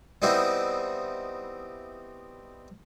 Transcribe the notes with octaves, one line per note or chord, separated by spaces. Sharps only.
G3 B3 C4 D#4 E4 F#4